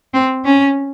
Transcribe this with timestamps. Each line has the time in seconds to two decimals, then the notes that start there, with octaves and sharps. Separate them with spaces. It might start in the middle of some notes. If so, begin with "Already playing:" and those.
0.14 C4
0.45 C#4